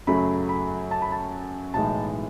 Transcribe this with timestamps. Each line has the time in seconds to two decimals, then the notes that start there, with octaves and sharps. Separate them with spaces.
0.07 F#2 C#3 F#3 A3 B5
0.49 B5
0.91 A5
1.02 B5
1.12 A5
1.74 B1 A2 E3 G#3 D#4 A5